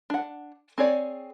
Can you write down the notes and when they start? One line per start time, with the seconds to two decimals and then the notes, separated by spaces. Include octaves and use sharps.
0.10 D4 F#5
0.78 C4 G#4 C#5 D5